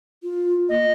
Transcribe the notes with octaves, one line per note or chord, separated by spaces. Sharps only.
F4
A#3 D#5